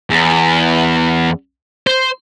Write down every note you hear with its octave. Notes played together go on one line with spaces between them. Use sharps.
E2
C5